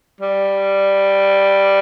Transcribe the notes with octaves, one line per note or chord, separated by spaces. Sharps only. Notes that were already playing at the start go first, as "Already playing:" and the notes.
G3